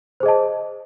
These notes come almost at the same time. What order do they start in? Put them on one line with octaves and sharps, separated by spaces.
C5 G#4 D#5 A5